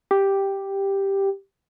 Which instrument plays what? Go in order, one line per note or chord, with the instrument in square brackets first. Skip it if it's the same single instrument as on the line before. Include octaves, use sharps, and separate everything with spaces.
[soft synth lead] G4